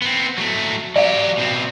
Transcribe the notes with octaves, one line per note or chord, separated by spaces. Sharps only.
B3 C4
F#3 A3
F#3 G4 D5 F5
B2 C4